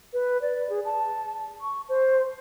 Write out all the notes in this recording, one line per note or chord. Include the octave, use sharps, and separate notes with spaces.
B4
D5
G#4
A5
C#6
C5